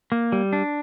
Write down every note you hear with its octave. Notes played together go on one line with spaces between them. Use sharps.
A#3
G3
D4